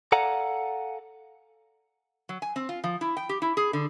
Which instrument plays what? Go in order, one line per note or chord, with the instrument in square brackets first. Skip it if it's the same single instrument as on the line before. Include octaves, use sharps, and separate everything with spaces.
[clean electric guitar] A4 D5 F5 F#5 G#5 A#5
[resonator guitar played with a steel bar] F#3
G#5
C4
F4
F3
E4
G5
G4
E4
G#4
D3